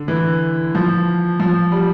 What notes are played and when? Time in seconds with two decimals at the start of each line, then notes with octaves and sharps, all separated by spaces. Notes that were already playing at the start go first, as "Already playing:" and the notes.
Already playing: D3
0.08 E3
0.75 F3
1.40 F3
1.72 G3